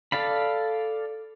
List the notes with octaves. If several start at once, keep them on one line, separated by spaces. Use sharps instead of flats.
A4 D5 F5 B5